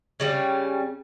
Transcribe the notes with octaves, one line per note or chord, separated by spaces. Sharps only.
C#3 G3 C#4